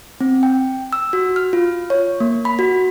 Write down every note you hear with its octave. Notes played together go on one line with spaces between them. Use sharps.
C4
G5
E6
F#4
F6
F4
C#5
A#3
B5
F#4